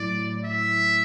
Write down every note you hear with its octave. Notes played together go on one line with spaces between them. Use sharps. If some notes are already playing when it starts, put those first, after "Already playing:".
Already playing: A2 F#3 A3 E4 D5
E5